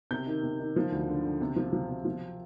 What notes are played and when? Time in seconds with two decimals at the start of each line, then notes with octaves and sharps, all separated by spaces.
0.11 C3 G6
0.26 D#3
0.43 C3
0.60 D#3
0.76 F3
0.92 D2
1.08 D3
1.24 D3
1.41 C3
1.56 F3
1.73 F3
1.89 C3
2.05 F3